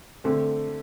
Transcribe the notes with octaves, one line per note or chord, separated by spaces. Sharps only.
D3 A3 C4